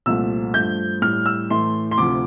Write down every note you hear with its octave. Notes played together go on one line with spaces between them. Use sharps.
C2 A#2 F3 A3 E6
G2 F3 A3 G6
A2 G3 F6
E6
A2 E3 A3 C6
C6
D2 C3 F3 D6